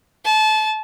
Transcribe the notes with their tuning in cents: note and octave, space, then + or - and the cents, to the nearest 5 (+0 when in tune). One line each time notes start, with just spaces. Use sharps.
A5 -25